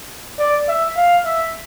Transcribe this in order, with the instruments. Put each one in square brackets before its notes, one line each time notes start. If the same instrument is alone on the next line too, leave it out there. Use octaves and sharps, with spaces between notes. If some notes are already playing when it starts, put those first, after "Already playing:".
[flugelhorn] D5
E5
F5
E5